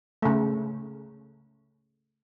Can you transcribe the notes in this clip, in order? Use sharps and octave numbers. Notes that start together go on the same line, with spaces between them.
C#3 A3